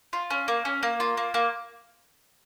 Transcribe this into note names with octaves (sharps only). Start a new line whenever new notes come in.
F4
C#4
A#3
C#4
A#3
F4
A#3
A#3